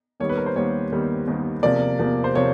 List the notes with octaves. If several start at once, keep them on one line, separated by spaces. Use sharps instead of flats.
D#2 D#3 G3 B3 C#5
B4
A#4
C5
D#2 D#3 G3 B3 C#5
D#2 D#3 G3 B3
D#2 D#3 G3 B3
E2 C3 F3 A#3 D5
E2 C3 F3 A#3
C5
C3 F3 A#3 C#5